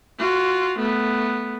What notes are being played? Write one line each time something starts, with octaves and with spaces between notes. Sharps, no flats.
F4 F#4
A3 B3